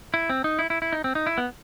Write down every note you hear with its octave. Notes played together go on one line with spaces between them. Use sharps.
E4
C4
D#4
E4
E4
E4
D#4
C4
D#4
E4
B3